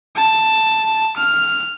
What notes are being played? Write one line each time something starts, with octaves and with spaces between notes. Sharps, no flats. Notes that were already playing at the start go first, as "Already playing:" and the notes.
A5
F6